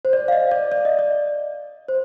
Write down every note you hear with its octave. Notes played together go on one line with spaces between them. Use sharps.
C5
D5
F5
D#5
D5
D5
D#5
D5
C5